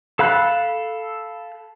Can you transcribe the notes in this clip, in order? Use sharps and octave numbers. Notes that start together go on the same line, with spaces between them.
A4 F5 B5 F#6